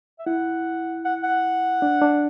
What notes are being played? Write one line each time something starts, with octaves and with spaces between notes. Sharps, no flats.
E5
E4 F#5
F#5
F#5
D4
D4